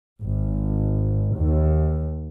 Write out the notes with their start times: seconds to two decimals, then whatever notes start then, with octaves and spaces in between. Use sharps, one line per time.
0.22 G#1
1.36 D#2